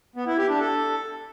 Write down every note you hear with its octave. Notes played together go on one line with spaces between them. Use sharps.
B3
E4
G4
D4
A4